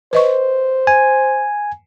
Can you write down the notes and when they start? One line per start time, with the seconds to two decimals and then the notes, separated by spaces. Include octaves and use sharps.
0.13 B4 C5 D#5 C#6
0.87 G#5